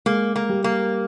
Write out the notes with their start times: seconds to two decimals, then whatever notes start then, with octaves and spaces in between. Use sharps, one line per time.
0.06 G#3 A#3 G#4
0.36 A#3
0.50 G3 G4
0.64 A#3